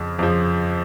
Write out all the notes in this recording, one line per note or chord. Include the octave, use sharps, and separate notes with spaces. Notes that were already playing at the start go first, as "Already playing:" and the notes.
Already playing: F2 C#3 F3
F2 C#3 F3